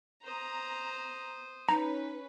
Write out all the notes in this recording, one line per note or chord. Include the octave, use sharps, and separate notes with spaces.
C5 A#5 D#6
C#4 D#4 B4 A#5